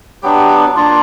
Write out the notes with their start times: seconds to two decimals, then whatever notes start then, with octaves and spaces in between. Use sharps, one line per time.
0.23 F#3 B3 D4 G4
0.76 A#3 D4 F4